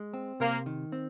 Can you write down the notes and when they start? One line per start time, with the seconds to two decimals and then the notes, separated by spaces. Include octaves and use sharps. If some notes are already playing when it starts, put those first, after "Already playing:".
Already playing: G#3
0.14 C4
0.40 C3 A#3
0.66 D#3
0.92 C4